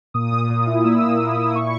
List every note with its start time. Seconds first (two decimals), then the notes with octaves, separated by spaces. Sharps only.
0.14 A#2 D#6
0.32 A#2
0.50 A#2
0.66 E4
0.84 A#3 E6
1.02 A#3
1.20 E4
1.38 A#2
1.55 E4 C#6